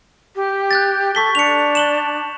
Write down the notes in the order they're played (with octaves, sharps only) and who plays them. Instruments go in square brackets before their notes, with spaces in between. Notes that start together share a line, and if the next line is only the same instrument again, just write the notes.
[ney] G4
[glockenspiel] F#6 G6 A6
[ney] A4 [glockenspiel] C#6 B6 G7
[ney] D4 [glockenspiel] C#7 F7
[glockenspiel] E7 F#7 G7